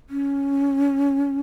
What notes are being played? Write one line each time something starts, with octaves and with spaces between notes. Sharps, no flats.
C#4